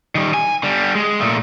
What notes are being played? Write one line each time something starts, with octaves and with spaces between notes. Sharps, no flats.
D#3 G3
G#5
D3 G3
G#3
A#2 A3